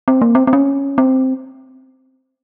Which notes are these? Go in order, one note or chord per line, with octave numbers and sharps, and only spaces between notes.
C4
A#3
C4
C4
C#4
C4